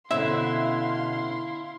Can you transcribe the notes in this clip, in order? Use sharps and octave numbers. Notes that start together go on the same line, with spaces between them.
B2 D3 C#4 E4 C5 E5 F5 C6